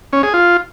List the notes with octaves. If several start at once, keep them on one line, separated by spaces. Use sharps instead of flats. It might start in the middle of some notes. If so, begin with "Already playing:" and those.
C#4
G#4
F4